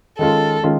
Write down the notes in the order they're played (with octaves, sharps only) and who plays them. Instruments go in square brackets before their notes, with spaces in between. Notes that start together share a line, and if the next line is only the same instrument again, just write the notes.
[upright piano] D#3 G#3 C#4 F4 [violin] A4
[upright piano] D#3 G#3 C#4 F4